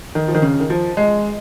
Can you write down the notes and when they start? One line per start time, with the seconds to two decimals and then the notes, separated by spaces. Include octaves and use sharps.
0.15 D#3
0.28 F3
0.35 D#3
0.42 C#3
0.60 D#3
0.70 F3
0.97 G#3